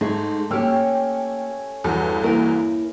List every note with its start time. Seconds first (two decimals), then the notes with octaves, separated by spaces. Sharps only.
0.01 G#2 A3 D#4 G#4
0.51 A#3 C#4 G4 C#5 G5 E6 F6
1.84 E2 G2 F#4 A4
2.23 A#3 E4 A#4